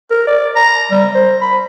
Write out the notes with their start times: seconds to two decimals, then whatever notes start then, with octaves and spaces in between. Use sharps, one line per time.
0.11 A#4
0.27 D5
0.56 A#5
0.91 G3
1.14 C5
1.41 B5